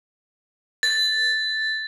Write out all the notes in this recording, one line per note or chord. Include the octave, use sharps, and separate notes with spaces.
A6